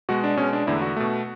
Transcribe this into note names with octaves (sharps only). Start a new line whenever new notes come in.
B2 G#3 F#4
D4
B2 G#3 C#4
D4
E2 D3 A3 E4
F#4
B2 A3